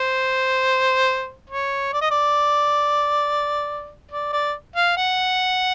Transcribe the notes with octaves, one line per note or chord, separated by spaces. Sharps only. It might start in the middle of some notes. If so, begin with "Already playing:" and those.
Already playing: C5
C#5
D5
D#5
D5
D5
D5
F5
F#5